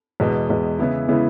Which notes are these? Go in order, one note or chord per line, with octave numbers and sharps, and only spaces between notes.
E2 B2 G#3
E2 B2 G#3
C#3 E3 G#3 B3 E4
C#3 E3 G#3 B3 E4